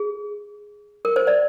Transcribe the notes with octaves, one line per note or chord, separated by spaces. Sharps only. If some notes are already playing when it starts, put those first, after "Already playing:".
Already playing: G#4
A#4
C5
D5